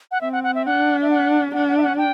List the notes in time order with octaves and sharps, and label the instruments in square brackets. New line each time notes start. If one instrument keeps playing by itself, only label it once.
[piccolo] F#5
[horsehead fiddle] C4 [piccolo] E5
[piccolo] F#5
F#5
E5
[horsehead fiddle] D4 [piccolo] F#5
[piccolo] E5
F#5
[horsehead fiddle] D4 [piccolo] F#5
[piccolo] F#5
E5
F#5
G5